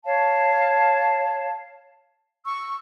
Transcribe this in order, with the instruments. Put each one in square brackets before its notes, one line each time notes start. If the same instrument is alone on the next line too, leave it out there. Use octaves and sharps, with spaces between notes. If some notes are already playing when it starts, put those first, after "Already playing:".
[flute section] C#5 F5 A5
C#6 E6